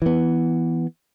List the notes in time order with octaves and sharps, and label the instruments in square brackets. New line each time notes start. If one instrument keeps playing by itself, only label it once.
[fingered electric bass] E3 B3